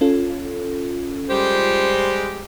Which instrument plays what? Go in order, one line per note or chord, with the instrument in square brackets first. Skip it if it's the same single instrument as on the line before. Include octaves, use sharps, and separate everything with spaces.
[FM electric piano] C#4 F4 A4
[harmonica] G3 G#3 G4 [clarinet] C5